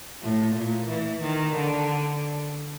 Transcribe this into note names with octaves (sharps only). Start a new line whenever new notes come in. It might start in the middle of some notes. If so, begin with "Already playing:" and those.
A2
A#2
E3
D#3
D3